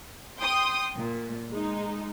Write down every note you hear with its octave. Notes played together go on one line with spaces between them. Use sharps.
G5 C6 D#6
A#2
G#3 D#4